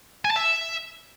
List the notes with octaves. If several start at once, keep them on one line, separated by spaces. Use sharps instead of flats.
G#5
A5
E5